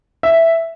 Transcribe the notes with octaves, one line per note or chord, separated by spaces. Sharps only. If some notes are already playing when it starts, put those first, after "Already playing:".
E5